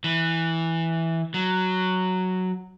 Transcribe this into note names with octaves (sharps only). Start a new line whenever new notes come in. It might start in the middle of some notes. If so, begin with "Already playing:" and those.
E3
F#3